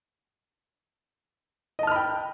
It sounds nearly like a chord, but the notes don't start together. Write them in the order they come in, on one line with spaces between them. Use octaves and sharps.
D#5 A5 F6 B5 G5